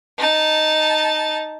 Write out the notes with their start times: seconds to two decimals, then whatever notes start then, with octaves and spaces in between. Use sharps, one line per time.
0.18 D#4 A5